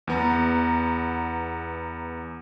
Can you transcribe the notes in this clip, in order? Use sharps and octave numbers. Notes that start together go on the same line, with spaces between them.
E2 B3 A#5